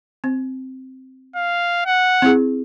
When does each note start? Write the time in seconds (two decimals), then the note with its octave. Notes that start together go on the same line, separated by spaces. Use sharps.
0.24 C4
1.36 F5
1.86 F#5
2.22 C4 E4 G#4